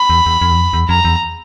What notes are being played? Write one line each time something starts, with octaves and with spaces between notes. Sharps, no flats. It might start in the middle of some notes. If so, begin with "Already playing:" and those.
Already playing: B5
E2
E2
F2
E2
F2
E2
F2 A#5
E2